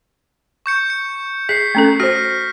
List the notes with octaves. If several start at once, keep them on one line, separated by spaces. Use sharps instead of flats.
C#6 G6 C#7
C#7
G#4 B6 C7
A3 C#4 A4
F#4 C5 F6 A#6